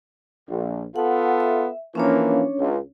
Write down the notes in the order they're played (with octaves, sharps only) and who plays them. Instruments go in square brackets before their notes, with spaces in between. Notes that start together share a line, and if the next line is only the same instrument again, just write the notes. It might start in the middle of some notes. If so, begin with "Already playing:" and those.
[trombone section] A#1
[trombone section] B3 F4 A4 [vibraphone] F#5
[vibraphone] E5
[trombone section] E3 F3 A#3 [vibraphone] C#4 D4 C#5
[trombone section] C#2